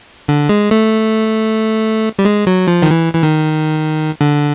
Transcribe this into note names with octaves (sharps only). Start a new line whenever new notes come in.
D3
G#3
A3
G3
G#3
F#3
F3
D#3
E3
E3
D#3
D3